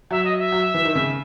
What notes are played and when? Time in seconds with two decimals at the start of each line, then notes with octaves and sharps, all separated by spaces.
0.11 F#3 E5
0.25 D#5
0.38 E5
0.52 F#3
0.74 E3
0.85 D#3
0.95 C#3